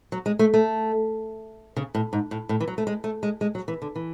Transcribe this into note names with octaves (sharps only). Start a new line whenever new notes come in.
F#3
G#3
A3
A3
C#3
A2
G#2
A2
A2
E3
F#3
A3
G#3
A3
G#3
G#3
F#3
E3
D3
E3